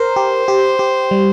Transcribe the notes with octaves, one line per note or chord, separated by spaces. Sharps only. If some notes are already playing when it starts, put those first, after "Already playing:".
Already playing: A#4 C5
G4
G4
G4
G3